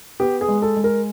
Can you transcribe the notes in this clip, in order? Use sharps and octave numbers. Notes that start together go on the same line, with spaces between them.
B3 G4
G#4
G#3
A4
G#3
A#4